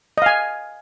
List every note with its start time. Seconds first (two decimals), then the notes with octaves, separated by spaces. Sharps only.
0.18 D#5
0.22 F5
0.26 G#5